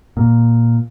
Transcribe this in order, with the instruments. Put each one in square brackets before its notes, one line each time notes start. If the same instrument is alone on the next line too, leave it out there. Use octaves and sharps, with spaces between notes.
[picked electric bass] A#2